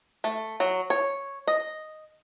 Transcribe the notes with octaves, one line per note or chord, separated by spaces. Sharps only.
A3
F#3
C#5
D#5